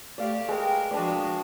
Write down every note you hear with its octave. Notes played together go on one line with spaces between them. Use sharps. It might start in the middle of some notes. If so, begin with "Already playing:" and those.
A3 G4 D5 F5
G#3 A#4 B4 G5
F3 G#3 D4 F#4 B4 D5